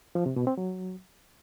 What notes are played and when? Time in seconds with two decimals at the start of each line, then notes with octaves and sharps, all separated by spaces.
0.15 F3
0.26 C3
0.36 B2
0.47 C4
0.58 F#3